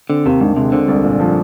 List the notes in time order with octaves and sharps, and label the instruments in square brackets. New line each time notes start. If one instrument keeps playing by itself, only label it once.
[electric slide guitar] D3 [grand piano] C4
[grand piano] D#2 [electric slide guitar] C3
[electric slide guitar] G#2 [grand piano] D3
[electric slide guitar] C3 [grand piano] G#3
[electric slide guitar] D3 [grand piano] C4
[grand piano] C2
A#2
F3